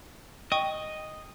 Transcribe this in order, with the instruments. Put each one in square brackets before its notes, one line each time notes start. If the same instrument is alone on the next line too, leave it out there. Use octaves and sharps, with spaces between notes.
[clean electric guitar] D#5 [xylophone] G5 C#6 D#6